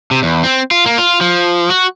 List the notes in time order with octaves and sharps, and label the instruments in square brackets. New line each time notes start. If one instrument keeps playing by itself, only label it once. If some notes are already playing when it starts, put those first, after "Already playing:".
[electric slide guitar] C3
E2
C4
F4
A#3
F4
F3
F#4